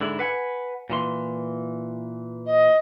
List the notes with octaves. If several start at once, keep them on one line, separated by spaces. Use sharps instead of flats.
G#2 D3 E4
B4 F#5 G#5
A#2 E3 C6
D#5